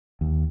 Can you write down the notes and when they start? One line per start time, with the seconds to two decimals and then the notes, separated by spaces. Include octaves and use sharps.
0.21 D#2